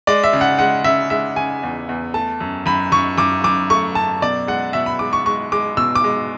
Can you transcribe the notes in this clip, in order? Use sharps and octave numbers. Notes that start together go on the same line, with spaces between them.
G#3 D5
E5
C#3
F#5
G#3 F#5
C#3 E5
G#3 E5
C#3 G#5
E2
E2
A3 A5
F#2
F#2 B5
F#2 C#6
F#2 D6
F#2 D6
A3 C#6
F#2 A5
B2 D5
G#3 F#5
B2 E5
B5
G#3 D6
C#6
G#3 C#6
G#3 D6
B2 E6
D6
G#3